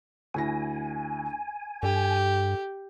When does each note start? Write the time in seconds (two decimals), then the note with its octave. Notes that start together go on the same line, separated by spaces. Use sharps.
0.34 D2 E4 G#5 A#6
1.83 G2 G4 A4